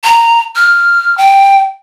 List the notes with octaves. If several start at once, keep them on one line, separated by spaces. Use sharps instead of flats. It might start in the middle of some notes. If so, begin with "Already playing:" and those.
A#5
F6
G5